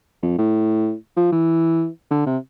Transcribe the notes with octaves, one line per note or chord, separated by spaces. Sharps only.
F2
A2
F3
E3
D3
C3